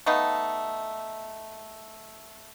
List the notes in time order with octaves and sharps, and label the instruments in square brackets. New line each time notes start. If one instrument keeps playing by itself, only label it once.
[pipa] A3 B3 D#4 F5